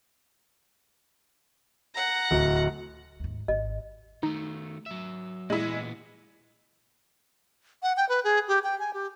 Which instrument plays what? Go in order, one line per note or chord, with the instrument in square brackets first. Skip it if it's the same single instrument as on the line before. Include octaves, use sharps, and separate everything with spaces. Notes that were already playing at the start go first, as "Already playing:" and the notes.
[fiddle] F#5 A#5
[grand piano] D1
[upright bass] D#2 G#2
[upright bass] G#1 [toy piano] D#5
[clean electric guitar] D#3 A3 [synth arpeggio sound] D#4
[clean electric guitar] F#3 E5
[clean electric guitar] A#2 E3 B3 [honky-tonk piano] G#3 E4
[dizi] F#5
G5
B4
G#4
G4
G5
G#5
G4